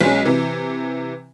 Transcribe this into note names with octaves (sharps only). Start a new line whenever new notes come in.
B1 G#3 C#4
C3 E3